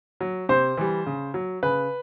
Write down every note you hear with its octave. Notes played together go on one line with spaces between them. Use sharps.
F#3
C3 C5
E3 G3
C#3
F#3
C#3 B4